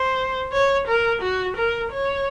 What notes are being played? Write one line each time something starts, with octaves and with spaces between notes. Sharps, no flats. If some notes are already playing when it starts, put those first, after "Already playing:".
Already playing: C5
C#5
A#4
F#4
A#4
C#5